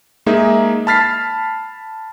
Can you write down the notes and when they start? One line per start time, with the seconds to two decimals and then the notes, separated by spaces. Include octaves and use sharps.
0.26 G#3 A#3 D#4 G#4 E5
0.87 A5 B5 F6 A6 B6 C7